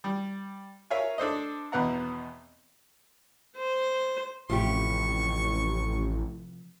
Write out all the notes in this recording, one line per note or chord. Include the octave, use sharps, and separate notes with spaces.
G3
A#4 C#5 E5 F5 G#5
D4 A4 C5 D#5
G#1 E2 B2 B3 F#5 A#5
C5
A1 A2 C3 F3 G4 C#6